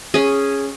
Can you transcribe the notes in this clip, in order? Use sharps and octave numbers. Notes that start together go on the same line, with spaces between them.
C#4 G#4